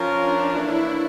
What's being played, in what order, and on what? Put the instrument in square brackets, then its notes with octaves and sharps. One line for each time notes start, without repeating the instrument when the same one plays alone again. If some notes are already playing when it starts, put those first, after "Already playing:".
Already playing: [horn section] F3 C#4 F4 A#4
[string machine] D4
[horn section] E3 A#3 D4 A4 C#5 [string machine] E4